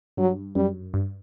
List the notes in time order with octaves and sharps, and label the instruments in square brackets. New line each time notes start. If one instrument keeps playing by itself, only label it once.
[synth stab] G2 [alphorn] F#3
[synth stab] F#2 [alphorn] G3
[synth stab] G2